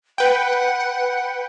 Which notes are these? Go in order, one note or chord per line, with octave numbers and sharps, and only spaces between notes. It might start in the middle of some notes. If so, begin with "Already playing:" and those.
B4 F#5 G5